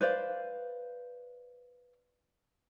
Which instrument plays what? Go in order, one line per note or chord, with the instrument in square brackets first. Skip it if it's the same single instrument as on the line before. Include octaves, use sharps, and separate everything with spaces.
[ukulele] B4 C5 D5 F5